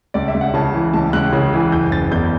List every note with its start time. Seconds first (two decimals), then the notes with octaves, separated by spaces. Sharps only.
0.14 C#2 D5
0.28 E5
0.34 C#2
0.41 F#5
0.54 C#3 A5
0.74 E3
0.93 C#2 A5
1.13 C#2 F#6
1.33 C#3
1.53 E3
1.72 F#1 G6
1.92 F#1 A6
2.12 E2 G6